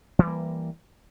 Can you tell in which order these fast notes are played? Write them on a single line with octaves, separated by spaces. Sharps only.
E3 G3 A#3